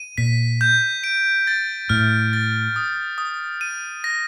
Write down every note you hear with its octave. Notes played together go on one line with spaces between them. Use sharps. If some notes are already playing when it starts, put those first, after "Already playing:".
Already playing: D#7
A#2 B6
G6
D7
A6
A2 F6
A6
D#6
D#6
D#7
A#6